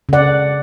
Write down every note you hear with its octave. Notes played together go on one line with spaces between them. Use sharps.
C#3 D5 F#5